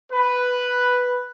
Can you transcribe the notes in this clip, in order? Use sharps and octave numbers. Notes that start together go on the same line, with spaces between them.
B4